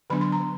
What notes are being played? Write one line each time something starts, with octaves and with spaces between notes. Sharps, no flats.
D3 F#3 B3 D4 B5
C6
A#5